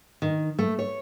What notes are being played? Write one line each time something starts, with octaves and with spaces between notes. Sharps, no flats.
D#3
A3
C#5